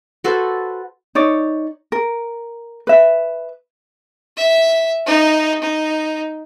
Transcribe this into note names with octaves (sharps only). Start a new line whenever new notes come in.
F#4 A4 B4 C5
D#4 C#5 D5
A#4
B4 E5
E5
D#4
D#4